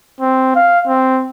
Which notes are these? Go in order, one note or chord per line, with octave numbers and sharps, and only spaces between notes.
C4
F5
C4